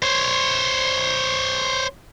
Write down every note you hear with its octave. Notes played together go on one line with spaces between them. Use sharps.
C5 C#5